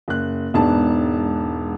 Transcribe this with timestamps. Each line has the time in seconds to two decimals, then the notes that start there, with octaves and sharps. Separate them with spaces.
0.08 F#1 F#6
0.54 E1 G#2 B3 D4 A5